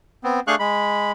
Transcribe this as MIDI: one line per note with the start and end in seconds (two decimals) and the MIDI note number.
0.24 0.40 59
0.24 0.40 60
0.47 0.55 57
0.47 0.55 62
0.47 0.55 68
0.47 0.55 77
0.47 0.55 85
0.47 0.55 90
0.59 1.12 56
0.59 1.12 83